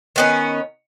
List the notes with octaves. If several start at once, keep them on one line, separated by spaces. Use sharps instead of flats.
D#3 B3 C#4